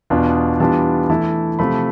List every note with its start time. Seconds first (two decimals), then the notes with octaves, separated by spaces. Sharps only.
0.10 E2 B2 B3 D4 F4
0.60 E3 G3 B3 D4 F4 A5
1.09 E3 A3 E4 A5
1.59 C3 F3 A3 B5